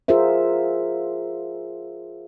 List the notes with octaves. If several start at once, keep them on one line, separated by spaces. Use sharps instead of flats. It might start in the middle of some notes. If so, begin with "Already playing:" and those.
F4 G#4 A#4 C5 E5